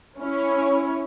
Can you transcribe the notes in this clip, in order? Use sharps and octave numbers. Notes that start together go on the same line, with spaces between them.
C#4 E4 C#5